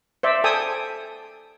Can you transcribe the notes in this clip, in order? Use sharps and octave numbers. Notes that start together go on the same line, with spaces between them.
C5 D5 E5
A4 G5 G#5 D#6 E6